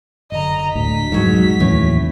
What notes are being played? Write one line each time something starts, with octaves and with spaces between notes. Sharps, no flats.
F#1 D3 D#5 A#5
D2 A2 D3 B6
F1 C#2 G#2 B2 F#3
D#2 A2 E3 C#4